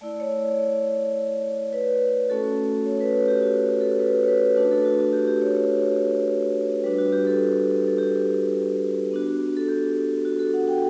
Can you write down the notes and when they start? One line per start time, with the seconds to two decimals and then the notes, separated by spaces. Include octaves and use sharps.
0.01 A3 E4 D5
0.20 C#5
0.40 D5
0.59 C#5
1.73 B4
2.29 A3 C#4 F#4 A4
2.86 C#5
3.01 B4
3.28 G4
3.42 F#4
3.81 A4
3.99 B4
4.24 C#5
4.28 B4
4.57 A3 D4 F#4 B4
4.71 A4
4.85 F#4
4.99 F#4
5.13 G4
5.28 G4
5.42 C#5
5.56 C#5
6.84 G3 D4 F#4 B4
6.98 F#4
7.12 G4
7.27 A4
7.88 A4
7.98 G4
9.11 B3 D4 F#4
9.57 A4
9.68 G4
10.25 F#4
10.39 A4
10.54 F#5
10.68 G5